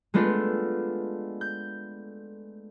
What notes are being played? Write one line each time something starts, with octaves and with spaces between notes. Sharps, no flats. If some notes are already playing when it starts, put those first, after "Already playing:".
G#3 A3 B3 D4 F4
G6